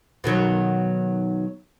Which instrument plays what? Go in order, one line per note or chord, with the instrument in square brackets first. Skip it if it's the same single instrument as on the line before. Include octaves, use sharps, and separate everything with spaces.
[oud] B2 D#3 F#3